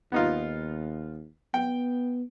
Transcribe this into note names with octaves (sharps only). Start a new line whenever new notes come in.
D#2 B3 D#4 F4
B3 G5